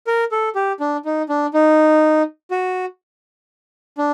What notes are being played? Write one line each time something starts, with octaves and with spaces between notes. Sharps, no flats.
A#4
A4
G4
D4
D#4
D4
D#4
F#4
D4